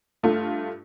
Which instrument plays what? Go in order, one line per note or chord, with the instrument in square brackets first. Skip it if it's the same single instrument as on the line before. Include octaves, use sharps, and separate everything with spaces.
[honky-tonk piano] G2 A3 F4